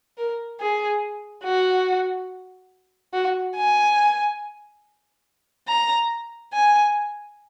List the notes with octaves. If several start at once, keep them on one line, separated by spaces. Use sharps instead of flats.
A#4
G#4
F#4
F#4
G#5
A#5
G#5